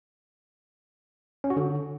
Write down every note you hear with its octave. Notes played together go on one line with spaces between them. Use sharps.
C#4
F#4
D3